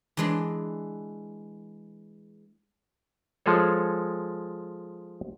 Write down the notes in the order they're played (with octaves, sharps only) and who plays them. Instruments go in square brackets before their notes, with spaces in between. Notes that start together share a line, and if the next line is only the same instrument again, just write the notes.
[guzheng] E3 G#3 D4
[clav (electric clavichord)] F3 G#3 G#4 A4 C#5